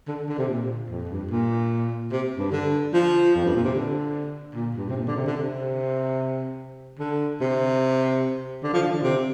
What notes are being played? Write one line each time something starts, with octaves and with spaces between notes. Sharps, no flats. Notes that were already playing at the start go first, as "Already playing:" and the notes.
D3
D3
C3
A#2
F2
G2
A#2
C3
G2
D3
F3
F2
G2
A#2
C3
D3
A#2
G2
C3
A#2
D3
C3
D3
C3
D3
C3
D3
F3
D3
D3
C3